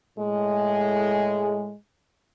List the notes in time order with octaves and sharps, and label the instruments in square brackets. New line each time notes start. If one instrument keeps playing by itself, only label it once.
[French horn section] A2 G#3